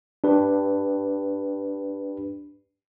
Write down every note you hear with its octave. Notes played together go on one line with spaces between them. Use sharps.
D4 G4 B4